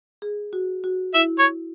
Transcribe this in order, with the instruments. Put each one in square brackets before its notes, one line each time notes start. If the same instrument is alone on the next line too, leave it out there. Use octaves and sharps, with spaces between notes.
[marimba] G#4
F#4
F#4
[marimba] E4 [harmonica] E5
[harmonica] C#5